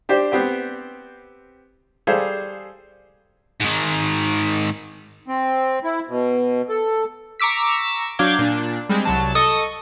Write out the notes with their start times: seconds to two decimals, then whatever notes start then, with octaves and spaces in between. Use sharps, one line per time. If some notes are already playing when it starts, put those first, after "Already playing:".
0.09 D4 G4 C5
0.32 B3 C4 G4
2.07 G3 G#4 A4 C5 F5
3.60 G#2 D#3
5.28 C4
5.84 E4
6.09 B2
6.69 A4
7.40 A#5 C#6 D6 E6 B6
8.19 F#3 D4 F5 D6 G6 G#6
8.39 A#2 D4
8.89 G3 G#3 C4
9.05 C2 F#3 A5
9.35 A4 D#5 C#6 D#6